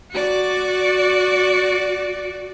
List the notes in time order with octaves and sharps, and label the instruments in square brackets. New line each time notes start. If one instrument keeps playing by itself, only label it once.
[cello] F#4 D5